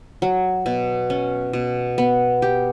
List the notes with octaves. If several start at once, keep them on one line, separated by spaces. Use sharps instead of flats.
F#3
B2
C#4
B2
B3
G4